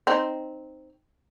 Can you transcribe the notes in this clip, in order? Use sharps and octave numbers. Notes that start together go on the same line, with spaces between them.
C4 D#4